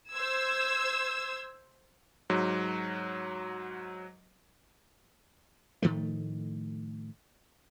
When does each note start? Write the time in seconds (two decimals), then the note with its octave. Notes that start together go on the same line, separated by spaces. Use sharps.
0.12 C5 E6 G#6
2.30 G#2 F#3
5.82 A2 D#3 F3 A3